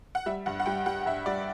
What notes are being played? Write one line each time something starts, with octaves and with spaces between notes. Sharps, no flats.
F#5
G3 E5
G2 F#5
F#5
G3 G5
G3 F#5
G2 E5
G3 D5